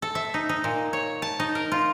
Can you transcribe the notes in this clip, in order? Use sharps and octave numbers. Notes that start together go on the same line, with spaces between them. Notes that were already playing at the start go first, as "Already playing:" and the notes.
A4
E5
D#4
D#4
A#2
C#5
A5
D#4
A#4
F4